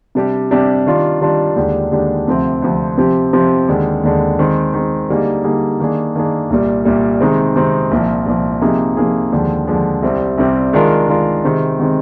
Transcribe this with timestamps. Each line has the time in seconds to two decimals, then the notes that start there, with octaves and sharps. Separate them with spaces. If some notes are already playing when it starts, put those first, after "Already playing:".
0.15 C3 G3 D4 G4
0.51 C3 G3 D4 G4
0.86 D#3 G3 D4 F4
1.21 D#3 G3 D4 F4
1.56 D#2 D3 G#3 D4 G4
1.92 D#2 D3 G#3 D4 G4
2.27 D2 C3 F3 C4
2.62 D2 C3 F3 C4
2.98 C3 F3 C4 G4
3.33 C3 F3 C4 G4
3.68 D#2 D3 G#3
4.03 D#2 D3 G#3
4.39 D#3 G#3 C4
4.74 D#3 G#3 C4
5.09 D3 G3 A#3 D#4 G#4
5.44 D3 G3 A#3 D#4 G#4
5.80 D#3 A#3 D4 G#4
6.15 D#3 A#3 D4 G#4
6.50 C2 A#2 G3
6.85 C2 A#2 G3
7.21 C3 D#3 G#3 C4 D#4
7.56 C3 D#3 G#3 C4 D#4
7.91 C2 A#2 F3
8.26 C2 A#2 F3
8.61 C3 F3 A#3 D#4 G#4
8.97 C3 F3 A#3 D#4 G#4
9.32 D#2 D3 F3 G#3
9.67 D#2 D3 F3 G#3
10.02 C2 C3 G3 C4
10.38 C2 C3 G3 C4
10.73 D#3 G#3 D4 F4 A#4
11.08 D#3 G#3 D4 F4 A#4
11.44 C3 D#3 G#3 C4
11.79 C3 D#3 G#3 C4